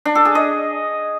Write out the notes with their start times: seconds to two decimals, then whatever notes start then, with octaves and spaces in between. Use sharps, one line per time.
0.05 D4
0.15 A4
0.25 G#4
0.35 D#5